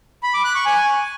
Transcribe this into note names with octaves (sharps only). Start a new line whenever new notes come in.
B5
D6
F#6
C#6
G#5